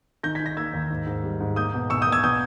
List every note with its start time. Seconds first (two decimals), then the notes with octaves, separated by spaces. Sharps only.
0.23 D#3 G6 A#6
0.35 G#6 B6
0.40 D#3
0.46 G6 A#6
0.57 A#3 E6 G#6
0.74 D#2
0.90 G#2
1.07 G#2
1.24 G3
1.40 G#2
1.56 A#3 D#6 G6
1.74 B2
1.90 B2 C#6 E6
2.02 D#6 G6
2.07 A#3
2.12 E6 G#6
2.24 B2 D#6 G6